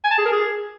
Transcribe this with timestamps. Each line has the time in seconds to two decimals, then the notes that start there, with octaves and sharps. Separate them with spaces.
0.04 G#5
0.11 A5
0.18 G#4
0.25 A#4
0.32 G#4